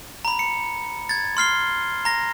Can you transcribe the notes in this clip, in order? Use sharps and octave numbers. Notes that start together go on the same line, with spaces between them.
A#5 B5
C#7
G#6 A6
C6 F6 C7 G7
A#5 A#6